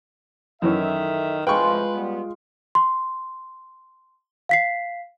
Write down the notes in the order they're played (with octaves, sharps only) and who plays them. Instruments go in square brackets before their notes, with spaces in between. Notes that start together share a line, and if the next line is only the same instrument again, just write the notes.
[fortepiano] F#2 E3 C#4 [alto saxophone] D#3 [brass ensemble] A4 D#5 E5
[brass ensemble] A2 C3 F3 [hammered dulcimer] G#3 F4 [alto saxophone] B4 [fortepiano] G5 C#6
[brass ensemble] G3 B3
[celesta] C6
F5 B6 C7